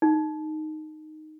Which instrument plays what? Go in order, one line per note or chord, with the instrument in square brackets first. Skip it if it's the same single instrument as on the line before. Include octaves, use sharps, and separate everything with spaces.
[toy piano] D#4